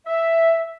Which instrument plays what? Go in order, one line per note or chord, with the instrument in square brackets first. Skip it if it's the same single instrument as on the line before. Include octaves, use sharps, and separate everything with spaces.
[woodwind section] E5